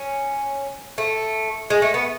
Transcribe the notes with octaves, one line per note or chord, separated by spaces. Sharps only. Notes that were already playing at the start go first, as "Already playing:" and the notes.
Already playing: C#4
A3
G#3
A3
B3